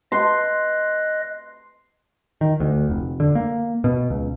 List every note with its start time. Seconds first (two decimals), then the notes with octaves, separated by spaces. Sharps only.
0.12 D#5 C6 F#6
2.41 D#3
2.60 D2
2.90 F1
3.20 D3
3.35 A#3
3.84 B2
4.10 C#2